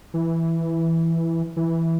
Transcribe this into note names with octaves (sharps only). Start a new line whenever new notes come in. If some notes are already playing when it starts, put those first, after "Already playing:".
E3
E3